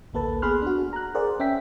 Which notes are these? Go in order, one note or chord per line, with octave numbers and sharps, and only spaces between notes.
A1 D2 A#3 A4 B4 A5
B3 G#4 B5 C6 F6 F#6
D4 F#4
A#5 F#6
G#4 A#4 C5 D5 F#5
C#4 E5 G5 B6